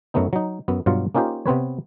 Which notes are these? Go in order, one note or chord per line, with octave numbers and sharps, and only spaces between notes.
F#2 F#3 A3 B3 D#4
F#3 D#4
F#2 B3
G2 B2 F#3 F4 F5
A#3 C#4 D#4 F4 G4 C5
C3 B3 C4 B4 C#5